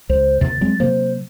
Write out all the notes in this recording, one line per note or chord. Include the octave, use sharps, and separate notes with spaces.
C#2 C5
D#2 C3 A6
F#3 G#3 C4
C3 F#3 A#3 C5